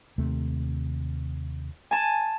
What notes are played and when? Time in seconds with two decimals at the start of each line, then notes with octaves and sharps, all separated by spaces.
0.18 D#2 C3 A3
1.91 G#5 A5